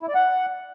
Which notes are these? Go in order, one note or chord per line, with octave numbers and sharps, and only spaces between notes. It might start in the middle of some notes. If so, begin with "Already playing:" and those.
E4
D5
F#5